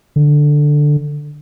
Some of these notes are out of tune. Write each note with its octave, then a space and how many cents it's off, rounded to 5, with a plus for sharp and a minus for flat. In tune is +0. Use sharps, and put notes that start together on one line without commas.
D3 +5